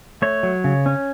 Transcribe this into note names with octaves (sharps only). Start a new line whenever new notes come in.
A3 C#5
F#3
C#3
C#4